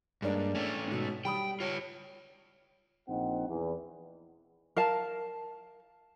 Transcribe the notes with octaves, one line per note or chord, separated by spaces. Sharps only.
G2 G#3 A#3 D4
A3 C#4
G#2 B2
G3 G5 B5 D#6
F4 C#5
A#1 C4 D#4 F#5
E2
A#4 F5 A5